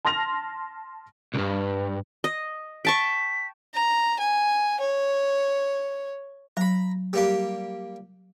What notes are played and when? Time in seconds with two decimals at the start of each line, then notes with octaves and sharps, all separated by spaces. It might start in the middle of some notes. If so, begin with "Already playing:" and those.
0.05 A5 C6 F6 A#6 F7
1.34 C2 G2
2.24 D#5
2.85 G5 A5 C#6 B6
3.74 A#5
4.19 G#5
4.80 C#5
6.57 F#3 A#5 B5
7.13 G3 A#3 G4